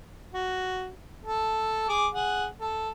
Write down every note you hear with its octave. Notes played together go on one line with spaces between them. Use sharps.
F#4
A4
G#4 D6
G#4 F#5
A4